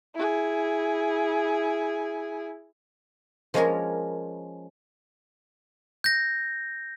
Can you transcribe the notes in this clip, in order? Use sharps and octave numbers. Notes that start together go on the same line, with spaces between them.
E4 G#4
F3 G#3 A#3 C#4 G#4 A#4
G6 A#6